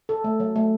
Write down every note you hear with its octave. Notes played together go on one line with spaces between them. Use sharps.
A4
A3
F#3
A3